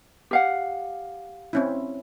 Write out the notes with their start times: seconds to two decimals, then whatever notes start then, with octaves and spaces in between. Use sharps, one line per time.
0.31 G4 F5 F#5
1.53 C4 C#4 E4